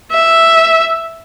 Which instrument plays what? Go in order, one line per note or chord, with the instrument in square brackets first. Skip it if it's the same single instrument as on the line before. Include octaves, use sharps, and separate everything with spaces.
[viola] E5